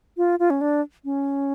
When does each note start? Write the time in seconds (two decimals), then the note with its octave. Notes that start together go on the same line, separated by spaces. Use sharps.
0.17 F4
0.39 F4
0.50 C#4
0.61 D4
1.05 C#4